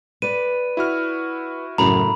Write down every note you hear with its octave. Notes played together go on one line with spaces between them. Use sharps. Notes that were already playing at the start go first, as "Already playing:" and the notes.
B4 D5 D#7
E4 F#4 F6
F#2 A2 C#3 A#5 B5